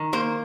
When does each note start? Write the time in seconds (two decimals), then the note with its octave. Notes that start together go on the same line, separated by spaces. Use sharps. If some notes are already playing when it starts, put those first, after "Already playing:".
Already playing: D#3
0.13 A#3 C5